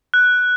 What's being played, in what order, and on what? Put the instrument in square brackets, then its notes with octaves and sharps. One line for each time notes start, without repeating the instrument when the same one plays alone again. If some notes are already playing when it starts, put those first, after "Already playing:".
[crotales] F#6